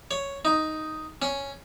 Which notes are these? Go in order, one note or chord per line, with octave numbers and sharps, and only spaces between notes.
C#5
D#4
C#4